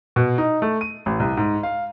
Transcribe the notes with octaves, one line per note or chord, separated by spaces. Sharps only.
B2
D#4
A3
D#7
A1
C2
G#2
F5